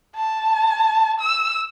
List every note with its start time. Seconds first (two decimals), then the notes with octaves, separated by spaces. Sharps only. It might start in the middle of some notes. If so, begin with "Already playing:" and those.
0.16 A5
1.20 E6